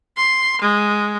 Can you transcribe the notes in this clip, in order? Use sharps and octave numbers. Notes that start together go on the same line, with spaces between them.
C6
G#3